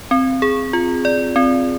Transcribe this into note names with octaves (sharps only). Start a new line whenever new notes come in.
C4
G#4
F4
D5
C4